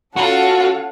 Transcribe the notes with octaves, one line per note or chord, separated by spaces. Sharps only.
C#4 F4 F#4 A4 F#5